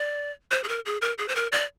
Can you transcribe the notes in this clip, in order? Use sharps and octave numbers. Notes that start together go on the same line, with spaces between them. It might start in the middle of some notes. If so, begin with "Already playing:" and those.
Already playing: D5
C5
G#4
A#4
G#4
A#4
G#4
C5
A#4
D5